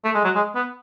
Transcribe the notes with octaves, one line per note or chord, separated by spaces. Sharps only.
A3
G#3
F#3
G#3
B3